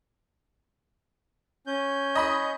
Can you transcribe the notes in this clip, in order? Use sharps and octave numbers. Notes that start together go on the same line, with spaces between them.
C#4 G6
D#5 B5 D#6